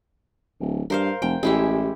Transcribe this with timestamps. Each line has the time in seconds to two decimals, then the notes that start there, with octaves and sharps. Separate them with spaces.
0.60 D1
0.90 G2 A#4 C5 F5
1.22 F1 G5
1.43 A1 G#3 E4 G4